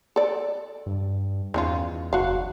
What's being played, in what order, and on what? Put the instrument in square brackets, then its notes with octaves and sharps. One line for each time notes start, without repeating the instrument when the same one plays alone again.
[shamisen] A4 D5
[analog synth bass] G2
[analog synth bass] E2 [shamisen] D#3 C#4 F4
[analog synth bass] F#1 [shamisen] F#4 F5